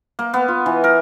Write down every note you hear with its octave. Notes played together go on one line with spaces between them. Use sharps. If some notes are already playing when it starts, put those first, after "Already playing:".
A#3
B3
F4
E3
A#4